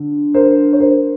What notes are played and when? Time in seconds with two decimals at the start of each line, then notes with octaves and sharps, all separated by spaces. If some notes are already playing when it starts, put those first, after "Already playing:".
Already playing: D3
0.34 A#4 C5
0.73 C#5
0.80 A#4 C5